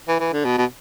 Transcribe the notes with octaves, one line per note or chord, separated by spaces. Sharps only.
E3
E3
D3
B2
B2